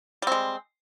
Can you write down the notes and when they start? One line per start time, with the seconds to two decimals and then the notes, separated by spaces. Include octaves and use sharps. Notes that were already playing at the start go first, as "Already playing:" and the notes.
0.22 G3
0.27 C4
0.32 G#3